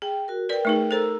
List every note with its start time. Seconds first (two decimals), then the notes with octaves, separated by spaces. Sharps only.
0.02 G#4 G5
0.28 F#4 A#4
0.49 A#4 B4 D5 G5
0.65 A3 D#4 G#4
0.91 A4 A#4 C5 A#5 E6